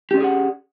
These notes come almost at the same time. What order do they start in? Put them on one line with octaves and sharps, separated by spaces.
G4 C#4 D5 G#4 F#5